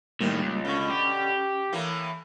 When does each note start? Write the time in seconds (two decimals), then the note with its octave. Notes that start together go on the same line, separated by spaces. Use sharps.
0.21 A2 D#3 G3 A#3 C4
0.42 C#2
0.65 B2 D3 C#4 C#6
0.90 G4
1.73 A2 E3 A#3